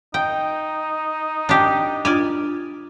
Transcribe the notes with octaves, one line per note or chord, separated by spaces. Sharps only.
D#4 G5
D4 G4
D4 F4 D5 G#5